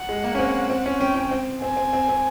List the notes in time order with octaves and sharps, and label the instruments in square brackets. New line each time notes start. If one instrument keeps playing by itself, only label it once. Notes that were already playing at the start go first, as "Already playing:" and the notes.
Already playing: [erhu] F#5
[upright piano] G#3
A#3
C#4
C4
C4
C#4
[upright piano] C#4 [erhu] G5
[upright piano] C#4
C4
[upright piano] C4 [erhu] G#5
[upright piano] C4
C4
C4